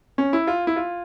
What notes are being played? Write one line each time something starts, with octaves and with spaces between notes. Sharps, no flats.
C#4
E4
F4
E4
F4